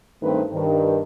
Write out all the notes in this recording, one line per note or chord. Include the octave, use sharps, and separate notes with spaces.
G2 D#3 A3 C4 G4 B4
G2 D#3